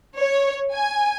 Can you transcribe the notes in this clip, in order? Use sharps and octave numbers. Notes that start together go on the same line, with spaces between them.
C#5
G#5